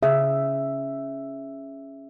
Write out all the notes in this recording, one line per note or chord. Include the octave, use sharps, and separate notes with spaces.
C#3 E5